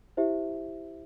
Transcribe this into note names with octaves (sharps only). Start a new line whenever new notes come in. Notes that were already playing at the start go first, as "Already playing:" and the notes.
E4 G4 C5 E5